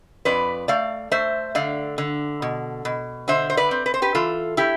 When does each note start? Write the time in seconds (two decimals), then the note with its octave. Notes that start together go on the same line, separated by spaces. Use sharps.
0.25 F2 B4 D5
0.68 A3 D5 F5
1.11 A3 C5 E5
1.55 D3 D5 F5
1.98 D3
2.42 B2
2.85 B2
3.28 D3 C5 E5
3.50 C5
3.57 B4 D5
3.71 C4
3.86 B4
3.94 C5
4.02 G4 B4
4.15 E3 F4 A4
4.57 A3 E4 G4